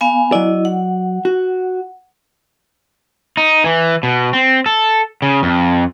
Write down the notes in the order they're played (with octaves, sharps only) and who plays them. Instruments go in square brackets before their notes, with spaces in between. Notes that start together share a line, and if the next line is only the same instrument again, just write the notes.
[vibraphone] B3 F5 G#5
[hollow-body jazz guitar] F#3 D5 [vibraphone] E4 D#5
[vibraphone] F#5
[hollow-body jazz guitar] F#4
[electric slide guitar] D#4
E3
B2
C4
A4
C#3
F2